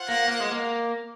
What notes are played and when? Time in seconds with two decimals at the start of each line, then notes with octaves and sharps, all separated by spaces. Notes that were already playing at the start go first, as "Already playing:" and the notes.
Already playing: F4 C5 F#5
0.09 A#3
0.28 A#3
0.40 G#3
0.52 A#3